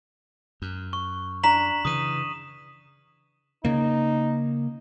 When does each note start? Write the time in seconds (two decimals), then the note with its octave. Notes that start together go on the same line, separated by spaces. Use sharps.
0.62 F#2
0.93 C#6
1.43 D4 A#5 B6 E7 F#7
1.85 C#3 E3 D#6 D#7 E7
3.65 C#3 A#3 D#4